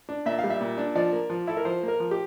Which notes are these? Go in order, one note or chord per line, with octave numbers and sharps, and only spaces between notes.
D4
A#2 E5
F5
G3
E5
A#2
D4
F3 D5
A#3
F3
E4 A4
A#4
F3 C5
A#3
A#4
F3
G4